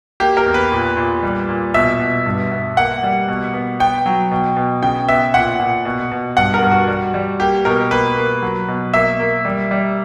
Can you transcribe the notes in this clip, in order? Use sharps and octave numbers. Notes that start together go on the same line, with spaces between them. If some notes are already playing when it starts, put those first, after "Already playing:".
A#3 G4
A#4
E2
B4
A#2
A#2
G3
A#2
B2 E5
B2
G2
B3
A#3 F#5
G3
B2
B3
B3 G5
F#3
B2
B2
C#3 G5
B3 E5
A#2 F#5
A#2
B2
B2
G2 F#5
A#4
G2
F#4
G3
G3
A#3 G4
B2 A#4
A#3 B4
A#3
F#3
B2
A#3 E5
A#3
G3
G3